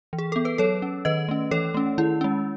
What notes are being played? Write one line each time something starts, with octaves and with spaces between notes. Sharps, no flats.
E3
G#4
B3 A4
B4
F#3 A4 C#5
C#4
D#3 B4 D#5
A3 C#4
E3 A4 C#5
A3 C#4
D#3 E4
G#3 C#4